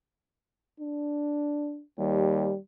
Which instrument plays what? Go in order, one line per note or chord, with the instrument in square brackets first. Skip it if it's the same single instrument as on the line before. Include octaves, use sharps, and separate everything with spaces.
[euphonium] D4
[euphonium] D#2 [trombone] G3